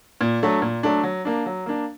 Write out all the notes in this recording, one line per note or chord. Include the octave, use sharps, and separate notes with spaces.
A#2
F#3 A3 D4
A#2
F#3 A3 D4
F#3
A#3 D4
F#3
A#3 D4